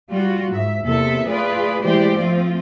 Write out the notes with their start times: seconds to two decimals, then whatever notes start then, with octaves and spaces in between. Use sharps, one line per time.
0.10 G3 F4 F#4
0.51 G#2 E5
0.83 E2 C3 A#3 A4 E5
1.28 A3 F4 G#4 B4 D5
1.80 E3 G#3 A3 G4 C5 D5
2.16 F3 A3 C4 F4